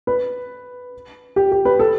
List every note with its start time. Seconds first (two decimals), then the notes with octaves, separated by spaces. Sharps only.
0.07 B4
1.36 G4
1.52 G4
1.65 B4
1.79 A4